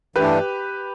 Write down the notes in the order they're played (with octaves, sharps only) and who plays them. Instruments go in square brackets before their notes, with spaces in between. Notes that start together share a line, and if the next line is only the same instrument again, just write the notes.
[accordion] G2 E3 A3 D4 [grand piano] G4 B4